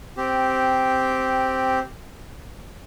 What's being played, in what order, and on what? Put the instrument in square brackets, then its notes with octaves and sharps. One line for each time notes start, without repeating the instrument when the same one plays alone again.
[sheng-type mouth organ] C4 G4